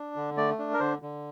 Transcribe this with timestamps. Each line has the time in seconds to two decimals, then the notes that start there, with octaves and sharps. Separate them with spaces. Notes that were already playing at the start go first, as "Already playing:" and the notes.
Already playing: D4
0.16 D3
0.37 A3 D5
0.59 D4
0.73 A#4
0.80 D3 C5
1.02 D3